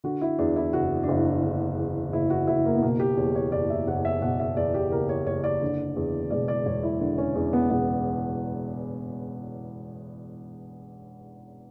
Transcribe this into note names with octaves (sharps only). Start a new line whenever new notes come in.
D3 F#4
E4
E2 D4
E4
F#1 F#4
D4
F#1 E4
D4
D3 D4
E2
F#1 E4
F#4
F#1 E4
A#3
B3
B2 A#3
G4
E2 C#5
C#5
F#1 D5
E5
F#1 F#5
E5
B2 F#5
E5
E2 D5
G4
F#1 A#4
C#5
F#1 C#5
D5
D3
E2
E1 D5
D5
E1 C#5
E4
D3 D4
C#4
E2 C#4
B3
E1 B3